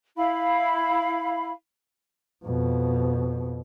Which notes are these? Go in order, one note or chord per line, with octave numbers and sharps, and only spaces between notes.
E4 F5 B5
F2 B2